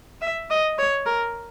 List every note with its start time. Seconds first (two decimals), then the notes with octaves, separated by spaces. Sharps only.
0.21 E5
0.50 D#5
0.78 C#5
1.06 A#4